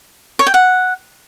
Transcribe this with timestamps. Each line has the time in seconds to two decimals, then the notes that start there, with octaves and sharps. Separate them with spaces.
0.39 C#5
0.47 G5
0.54 F#5